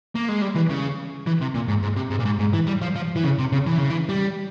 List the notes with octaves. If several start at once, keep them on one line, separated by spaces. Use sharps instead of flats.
A#3
G#3
G3
E3
C#3
E3
C3
A#2
G#2
G#2
C3
G#2
A#2
G#2
G#2
E3
G3
F3
F3
E3
C#3
C3
C#3
E3
C#3
E3
G3